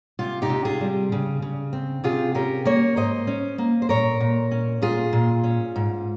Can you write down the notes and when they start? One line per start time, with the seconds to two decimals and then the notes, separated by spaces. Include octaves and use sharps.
0.19 C3 F4
0.42 D#4 G4
0.50 C3
0.65 F4 G#4
0.81 G3
1.12 C#3
1.42 C#3
1.73 C4
2.04 C3 F4 G#4
2.35 C#4 G4 A#4
2.65 A#3 A#4 C#5
2.96 G#2 C5 D#5
3.27 C#4
3.58 A#3
3.82 C5
3.89 A#2 A#4 C#5
4.20 A#2
4.51 C#4
4.82 A#2 F4 G#4
5.13 A#2
5.44 C#4
5.76 G#2